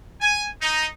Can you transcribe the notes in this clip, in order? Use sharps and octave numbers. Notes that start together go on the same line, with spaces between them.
G#5
D#4